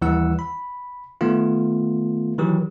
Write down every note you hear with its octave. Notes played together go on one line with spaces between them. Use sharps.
D#2 E3 G3 E4 F#5 E6
B5
D#3 A3 B3 F4
D#3 E3 F#3 G4